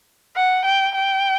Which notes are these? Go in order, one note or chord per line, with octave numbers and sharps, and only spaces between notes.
F#5
G5
G5